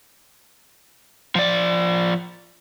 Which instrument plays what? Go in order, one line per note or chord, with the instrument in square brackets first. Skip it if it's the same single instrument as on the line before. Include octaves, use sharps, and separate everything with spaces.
[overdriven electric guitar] F3 D5